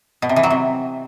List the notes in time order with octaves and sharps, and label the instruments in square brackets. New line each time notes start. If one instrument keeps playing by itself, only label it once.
[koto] B2
C3
E3
F#3
C3